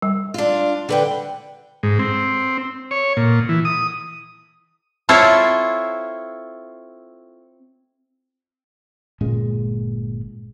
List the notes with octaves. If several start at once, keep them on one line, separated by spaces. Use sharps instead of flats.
G3
D4 F4
D3 B4 G5
G#2
C4
C#5
A#2
E3
D#6
C4 E4 F4 A4 C5 C#5
G1 A#2 G#3 C#4